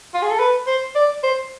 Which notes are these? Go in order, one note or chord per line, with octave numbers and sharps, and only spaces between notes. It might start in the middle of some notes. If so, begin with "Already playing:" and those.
F4
G#4
A4
B4
C5
D5
C5